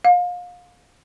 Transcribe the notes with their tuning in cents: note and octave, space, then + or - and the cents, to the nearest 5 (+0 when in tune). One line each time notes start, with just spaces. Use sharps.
F5 +30